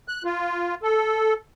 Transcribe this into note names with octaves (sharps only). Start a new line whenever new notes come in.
F#6
F4
A4